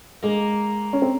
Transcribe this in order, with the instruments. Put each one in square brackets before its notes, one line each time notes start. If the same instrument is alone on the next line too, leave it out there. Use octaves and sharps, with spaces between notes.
[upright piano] G#3 [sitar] A#3
[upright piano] C#4
C4